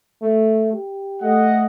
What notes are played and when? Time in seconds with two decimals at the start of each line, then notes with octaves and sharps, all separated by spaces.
0.22 A3
0.73 G4
1.23 A3 D#5 F#5